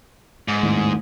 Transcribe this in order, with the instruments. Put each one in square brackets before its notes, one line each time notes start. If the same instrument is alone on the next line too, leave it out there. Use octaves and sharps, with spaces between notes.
[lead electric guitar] G#2
[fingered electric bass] D#2 A2 D#3